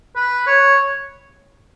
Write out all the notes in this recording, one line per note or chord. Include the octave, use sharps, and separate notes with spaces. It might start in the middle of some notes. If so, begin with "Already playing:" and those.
B4
C#5